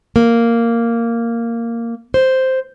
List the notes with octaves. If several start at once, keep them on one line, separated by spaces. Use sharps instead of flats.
A#3
C5